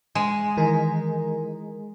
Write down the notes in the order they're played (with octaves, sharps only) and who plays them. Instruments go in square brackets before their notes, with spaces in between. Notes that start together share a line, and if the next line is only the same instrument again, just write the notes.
[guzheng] G#3
[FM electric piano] D#3 E3 A#4